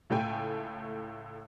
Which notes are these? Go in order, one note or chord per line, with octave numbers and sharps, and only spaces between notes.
C#2 A2 A3 G5 G#5